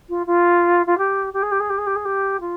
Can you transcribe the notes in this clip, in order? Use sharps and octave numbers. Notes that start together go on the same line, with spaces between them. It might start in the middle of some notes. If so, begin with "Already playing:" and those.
F4
F4
F4
G4
G4
G#4
G4
G#4
G4
G#4
G4
G#4
G4
F4